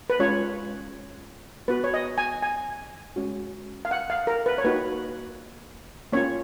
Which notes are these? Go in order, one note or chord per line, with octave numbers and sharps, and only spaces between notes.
B4
G#3 C#4 F4 C#5
B3 F#4 B4
C#5
D#5
G#5
G#5
G#3 C#4 F#4
F5
F#5
F5
A#4
B4
C#5
A#3 D#4 F#4 B4
A#3 C#4 F4 C#5